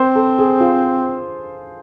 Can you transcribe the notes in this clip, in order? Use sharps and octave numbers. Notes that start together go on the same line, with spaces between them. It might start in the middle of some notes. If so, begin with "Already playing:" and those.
Already playing: C4 C5
A4
G#4
F4